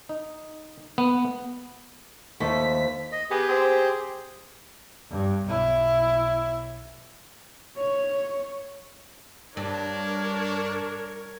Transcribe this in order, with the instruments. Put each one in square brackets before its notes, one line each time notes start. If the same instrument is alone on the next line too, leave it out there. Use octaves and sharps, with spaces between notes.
[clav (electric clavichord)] D#4
B3
[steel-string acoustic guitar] D#2 [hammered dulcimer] F3 A3 [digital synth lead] B6
[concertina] D#5
[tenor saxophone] B3 [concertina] G4 G#4
[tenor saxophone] C4
[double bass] G2
B1 E4
[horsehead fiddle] C#5
[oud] G2 [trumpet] D4 [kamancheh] A#4 C#5